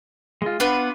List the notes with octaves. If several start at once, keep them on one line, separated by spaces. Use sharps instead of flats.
G#3 F4
B3 D4 F4 B4 F#5